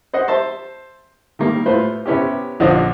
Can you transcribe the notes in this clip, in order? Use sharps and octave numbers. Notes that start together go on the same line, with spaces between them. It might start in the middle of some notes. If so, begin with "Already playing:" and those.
C5 D#5 F#5
C5 E5 A5 C6
D#3 G3 A#3
A2 A3 F4 B4 C5
C3 B3 C#4 E4 G4
A#1 D3 F4 C5 C#5 D#5